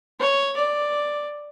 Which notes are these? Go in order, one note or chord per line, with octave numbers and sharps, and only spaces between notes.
C#5
D5